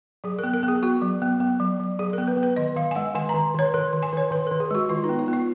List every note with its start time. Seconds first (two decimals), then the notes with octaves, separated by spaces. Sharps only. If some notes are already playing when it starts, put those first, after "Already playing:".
0.24 F#3 G#4
0.39 B3 A#4
0.54 A#4
0.63 B3
0.68 G#4
0.83 B3 F#4
1.02 F#3
1.22 B3
1.40 B3
1.60 F#3
1.80 F#3
1.99 F#3 G#4
2.13 B3 A#4
2.28 B4
2.37 B3
2.43 B4
2.56 D#3 D#5
2.76 D#3 F5
2.91 G#5
2.95 G#3 F#5
3.15 D#3 G#5
3.29 D#3 A#5
3.54 D#3 C#5
3.74 D#3 A#4
3.93 D#3
4.03 G#5
4.13 D#3 C#5
4.31 D#3 B4
4.47 D#3 A#4
4.60 G#4
4.71 G#3 F#4
4.89 D#3 F4
5.04 D#4
5.09 B3
5.19 F4
5.28 B3
5.33 F4